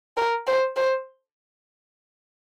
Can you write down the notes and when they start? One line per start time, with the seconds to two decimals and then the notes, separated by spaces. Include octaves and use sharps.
0.17 A#4
0.47 C5
0.76 C5